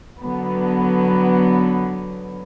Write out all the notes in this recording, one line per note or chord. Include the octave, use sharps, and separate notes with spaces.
D3 F#3 B3